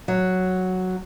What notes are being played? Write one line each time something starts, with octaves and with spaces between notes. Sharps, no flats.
F#3